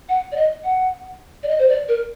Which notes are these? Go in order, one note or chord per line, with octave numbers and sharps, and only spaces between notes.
F#5
D5
D#5
F#5
D5
D#5
C5
D5
A#4